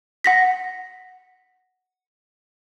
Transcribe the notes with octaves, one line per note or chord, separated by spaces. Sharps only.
F#5 A#6 B6